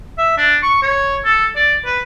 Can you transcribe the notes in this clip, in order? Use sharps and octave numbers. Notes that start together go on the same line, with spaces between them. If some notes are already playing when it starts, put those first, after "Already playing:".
E5
D4
C#6
C#5
A4
D5
B4